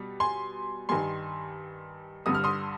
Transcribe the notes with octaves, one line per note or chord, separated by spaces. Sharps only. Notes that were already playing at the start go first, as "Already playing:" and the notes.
Already playing: B2 G3
G#5 C6
G2 D#3 G3 G#5 C6
G2 D3 G3 D#6
F6
C6 D#6